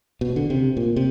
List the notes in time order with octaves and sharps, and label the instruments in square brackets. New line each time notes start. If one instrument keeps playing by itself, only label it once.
[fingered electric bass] B2
D3
C3
A#2
C3